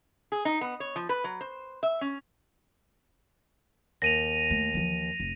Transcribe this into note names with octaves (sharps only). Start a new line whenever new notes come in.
G#4
D#4
B3
C#5
F3
B4
F#3
C5
E5
C#4
D#2 A#6 D#7 F7
A3
E3 F3
F1